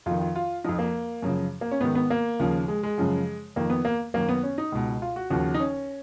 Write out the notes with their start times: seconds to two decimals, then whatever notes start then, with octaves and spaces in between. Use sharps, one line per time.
0.06 F2 D#3 F4
0.21 F4
0.36 F4
0.64 F2 F3 D#4
0.79 A#3
1.22 F#2 C#3 F3
1.61 A#3
1.71 C#4
1.80 G#2 D#3 B3
1.95 B3
2.10 A#3
2.40 D#2 C#3 F3
2.68 G#3
2.83 G#3
2.98 F#2 C#3 F3
3.56 F2 D#3 A#3
3.70 B3
3.85 A#3
4.14 F#2 D#3 A#3
4.28 B3
4.43 C#4
4.58 D#4
4.72 C#2 B2
5.02 F4
5.16 F#4
5.30 D#2 C#3 F3 F#4
5.54 D#4
5.60 C#4